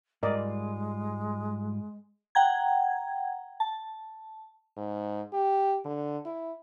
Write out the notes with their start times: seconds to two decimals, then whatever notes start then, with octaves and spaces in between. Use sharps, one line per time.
0.23 G#2 G3 G#3 F4 A#4 D5 D#5
2.35 F#5 G5 A#5 G#6
3.60 A5
4.77 G#2
5.33 G4
5.85 D3
6.25 E4